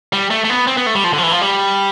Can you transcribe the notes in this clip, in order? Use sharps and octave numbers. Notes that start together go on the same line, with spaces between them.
G3
A3
A3
B3
C4
B3
A3
G3
F3
D3
F3
E3
F3
G3